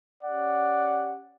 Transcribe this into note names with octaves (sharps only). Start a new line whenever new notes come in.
C#4 G4 D5 F#5